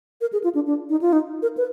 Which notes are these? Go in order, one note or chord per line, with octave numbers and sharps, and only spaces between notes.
A#4
G#4
F4
D4
D4
D#4
F4
D#4
A#4
B4